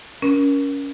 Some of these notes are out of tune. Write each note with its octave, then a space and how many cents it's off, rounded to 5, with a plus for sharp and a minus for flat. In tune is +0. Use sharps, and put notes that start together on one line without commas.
C#4 +20 A#4 +25